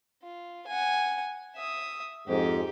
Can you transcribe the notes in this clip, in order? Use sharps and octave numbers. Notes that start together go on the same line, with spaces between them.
F4
F#5 G#5
E5 D#6
F2 G#2 D#4 G4